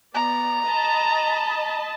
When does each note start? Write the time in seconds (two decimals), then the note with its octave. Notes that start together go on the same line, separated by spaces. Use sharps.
0.14 B3 D5 A#5
0.64 D#5 A5 B5